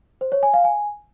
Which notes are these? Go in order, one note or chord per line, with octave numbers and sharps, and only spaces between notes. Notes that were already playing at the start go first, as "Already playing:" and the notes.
C5
C#5
G#5
F5
G#5